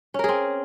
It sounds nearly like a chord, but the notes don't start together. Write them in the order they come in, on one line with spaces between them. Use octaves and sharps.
C#4 A#4 G#4 C4